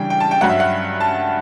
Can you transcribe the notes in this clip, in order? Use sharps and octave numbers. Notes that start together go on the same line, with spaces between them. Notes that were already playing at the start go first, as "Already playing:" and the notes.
Already playing: C#3 E3 G3 D4 G5
G5
A5
G5
G2 F#3 C#4 F#5
E5
F#5
A5